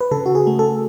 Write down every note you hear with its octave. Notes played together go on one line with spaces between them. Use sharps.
B4
C#3 A4
F#4
G#4
A3
A4